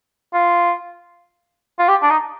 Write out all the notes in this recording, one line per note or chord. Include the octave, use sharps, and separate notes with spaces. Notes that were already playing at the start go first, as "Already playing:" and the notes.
F4
F4
G4
D4
D#4